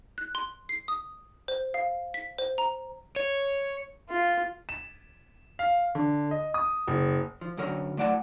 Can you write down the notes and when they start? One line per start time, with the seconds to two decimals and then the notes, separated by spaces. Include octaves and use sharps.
0.18 F#6
0.35 C6
0.69 C7
0.88 D#6
1.48 C5
1.74 F5
2.14 B6
2.38 C5
2.58 A#5
3.16 C#5
4.09 F4
4.69 E7
5.59 F5
5.95 D3
6.31 D#5
6.54 D#6
6.87 F#1
7.41 F3
7.57 F#2 D3 F#3 A#4 C#5
7.97 A2 F#3 D5 F#5 A5